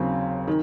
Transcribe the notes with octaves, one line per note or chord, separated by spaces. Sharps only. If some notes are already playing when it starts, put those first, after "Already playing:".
Already playing: D#2 C#3 F#3 C4
D#3